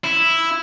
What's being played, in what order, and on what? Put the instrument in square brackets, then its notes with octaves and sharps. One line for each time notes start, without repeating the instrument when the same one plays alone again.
[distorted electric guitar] E4